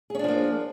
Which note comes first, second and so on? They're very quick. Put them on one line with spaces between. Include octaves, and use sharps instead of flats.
G#4 C#4 D4 F3 A#3